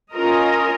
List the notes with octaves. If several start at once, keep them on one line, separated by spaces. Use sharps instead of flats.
C#4 F4 A#4 D#5